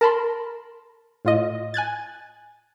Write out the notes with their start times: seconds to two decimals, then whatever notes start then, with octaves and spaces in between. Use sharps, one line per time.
0.01 A#4 A5 B5 C6
1.25 A2 F4 D#5
1.74 G#5 F#6 G#6 A6